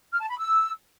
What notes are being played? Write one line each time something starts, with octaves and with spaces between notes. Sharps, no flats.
F6
A5
B5
E6